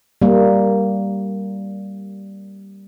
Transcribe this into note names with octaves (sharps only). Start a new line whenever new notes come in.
G3 A#3